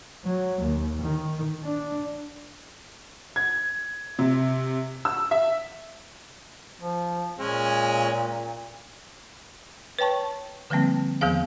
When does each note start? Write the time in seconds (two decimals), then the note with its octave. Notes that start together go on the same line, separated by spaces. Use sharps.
0.24 F#3
0.61 D#2
1.02 D#3
1.64 D4
3.36 G#6
4.19 C3
5.05 E6
5.31 E5
6.80 F3
7.39 A#2 G#3 C#4
9.99 B4 C#5 G5 A5 C#6
10.70 D3 F3 G3 A#3 C4
11.21 E2 D#3 F3 B3 G#4 F5